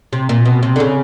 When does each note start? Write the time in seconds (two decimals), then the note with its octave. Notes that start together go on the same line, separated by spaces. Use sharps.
0.13 C3
0.29 A#2
0.45 B2
0.63 C3
0.76 D3
0.80 C#3